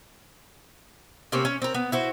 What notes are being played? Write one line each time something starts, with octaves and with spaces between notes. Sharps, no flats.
C3 A#3 C4 C#4
C#4
C4 A#4
B3
E4 F#4 C5